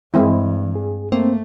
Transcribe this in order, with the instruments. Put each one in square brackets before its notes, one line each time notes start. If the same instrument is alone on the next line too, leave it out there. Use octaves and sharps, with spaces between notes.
[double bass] G2 [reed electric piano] E3 [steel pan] G#3 C4 E4
[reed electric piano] G#4
[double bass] A3 [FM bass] A#3 [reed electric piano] C4